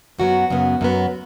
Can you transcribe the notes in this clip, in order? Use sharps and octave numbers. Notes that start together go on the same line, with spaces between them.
F#2 F#3 B3 F#4
F#2 C#3 B3
F#2 F#3 B3